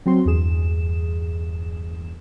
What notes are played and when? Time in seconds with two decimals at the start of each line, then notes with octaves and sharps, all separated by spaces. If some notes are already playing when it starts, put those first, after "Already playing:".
0.06 F#3 C4 F#4 C6
0.25 E2 G2 G#4 E7